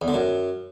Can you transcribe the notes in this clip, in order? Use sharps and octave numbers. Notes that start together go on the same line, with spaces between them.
E2
D3
F#2